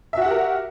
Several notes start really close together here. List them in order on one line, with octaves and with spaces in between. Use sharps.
E5 F#4 F#5 G4 A#4